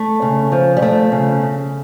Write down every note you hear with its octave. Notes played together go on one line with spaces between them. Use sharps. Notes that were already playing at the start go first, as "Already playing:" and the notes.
Already playing: A3
C#3
F3
G3
F3 A3
C#3
C#3